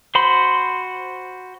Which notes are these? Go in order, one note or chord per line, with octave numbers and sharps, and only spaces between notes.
F#4 C5 B5 C6